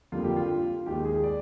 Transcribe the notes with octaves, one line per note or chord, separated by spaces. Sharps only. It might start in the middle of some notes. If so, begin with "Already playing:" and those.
F2 D3 G3 A#3 F4
G4
F4
D#2 D#3 G#3 G4
G#4
D5